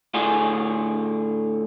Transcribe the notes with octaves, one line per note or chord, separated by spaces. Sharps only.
A2 D3 D4 F4 F#4 G#4